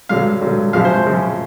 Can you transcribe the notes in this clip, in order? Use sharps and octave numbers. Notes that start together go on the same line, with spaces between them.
G2 D3 F#3 F5
G2 D3 F#3
F#2 C#3 F3 F5
C5
F#2 C#3 F3